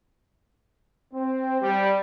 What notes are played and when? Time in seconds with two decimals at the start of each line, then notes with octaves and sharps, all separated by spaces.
1.13 C4
1.61 G3